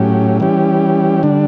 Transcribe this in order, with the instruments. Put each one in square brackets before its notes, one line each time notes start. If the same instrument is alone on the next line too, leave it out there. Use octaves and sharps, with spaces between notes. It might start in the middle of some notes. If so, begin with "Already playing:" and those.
Already playing: [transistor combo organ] A2 F#3 C#4 G4
E3 G3 C#4 G4
D3 G3 D4